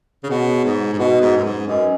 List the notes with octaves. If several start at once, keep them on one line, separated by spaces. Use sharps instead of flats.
C#3
B2 G#4 C#5 F#5
G#2
G#2
B2 D#4 F#4 B4 D#5 F#5
G#2
F#2
G#2
F#2 C#4 B4 D#5 G#5